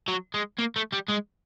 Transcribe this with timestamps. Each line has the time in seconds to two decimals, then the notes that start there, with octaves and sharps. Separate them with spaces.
0.08 F#3
0.34 G#3
0.58 A#3
0.76 A3
0.93 G3
1.09 G#3